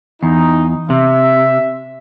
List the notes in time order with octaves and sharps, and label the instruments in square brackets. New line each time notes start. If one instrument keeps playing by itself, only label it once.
[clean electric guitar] E2 [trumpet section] D#4
[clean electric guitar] C3 [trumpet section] E5